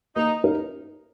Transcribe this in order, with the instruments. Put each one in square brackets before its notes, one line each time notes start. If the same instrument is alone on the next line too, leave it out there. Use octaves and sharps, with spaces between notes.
[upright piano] A#3 [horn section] D#4
[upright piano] D#4 A#4